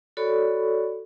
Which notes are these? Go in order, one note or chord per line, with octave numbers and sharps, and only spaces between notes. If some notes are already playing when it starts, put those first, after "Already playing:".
F#4 A4 C#5 D5 B5 C#6